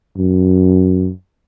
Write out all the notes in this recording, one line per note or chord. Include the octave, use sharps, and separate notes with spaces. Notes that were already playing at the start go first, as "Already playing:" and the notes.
F#2